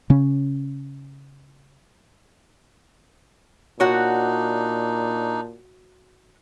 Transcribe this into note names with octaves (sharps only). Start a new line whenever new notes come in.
C#3 C#4
A#2 D4 D#4 F#4 C#5